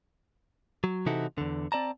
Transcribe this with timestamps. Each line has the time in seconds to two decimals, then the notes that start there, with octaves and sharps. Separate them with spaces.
0.84 F#3
1.06 C3 E3 D#4 E4 F#4 A4
1.38 E2 D3
1.72 C4 D5 A5 A#5